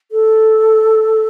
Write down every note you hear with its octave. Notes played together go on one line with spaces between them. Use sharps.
A4